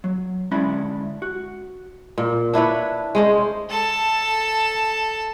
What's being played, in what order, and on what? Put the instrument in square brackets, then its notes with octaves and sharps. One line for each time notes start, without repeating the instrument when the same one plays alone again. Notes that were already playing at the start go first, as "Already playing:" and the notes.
[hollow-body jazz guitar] F#3
D3 G#3 C#4 D4 E4 B5
F#4
[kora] A#2
D4 E4 B4 C#5
G#3 C#4 C5
[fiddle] A4 A5